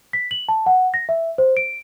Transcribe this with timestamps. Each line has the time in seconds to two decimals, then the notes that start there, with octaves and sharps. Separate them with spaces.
0.13 B6
0.31 F#7
0.49 A5
0.66 F#5
0.94 A#6
1.09 E5
1.38 C5
1.57 D7